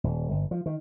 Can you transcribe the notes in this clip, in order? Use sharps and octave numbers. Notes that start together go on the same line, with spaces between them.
D#1
G1
F3
D#3